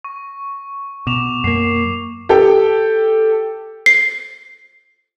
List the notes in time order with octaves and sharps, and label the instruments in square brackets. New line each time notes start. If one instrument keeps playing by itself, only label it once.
[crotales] C#6
[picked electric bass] B2 [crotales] D6 E7 F7
[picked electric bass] F#2 A#3 [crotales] C7
[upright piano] G4 A4 G5
[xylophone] C7